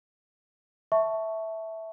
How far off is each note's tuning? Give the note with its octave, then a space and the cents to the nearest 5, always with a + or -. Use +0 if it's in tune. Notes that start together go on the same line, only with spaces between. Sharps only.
E5 -10 A5 +0 C#6 +0